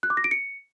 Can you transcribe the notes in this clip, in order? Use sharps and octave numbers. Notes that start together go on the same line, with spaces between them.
F#6
D6
A#6
D7
C#7